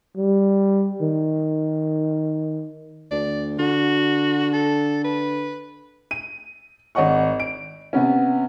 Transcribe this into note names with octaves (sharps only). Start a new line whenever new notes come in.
G3
D#3
D2 D5
D3 F#4
A4
B4
D#7
G#1 C#5 D#5 F#5 C#6
D7
C3 B3 C#4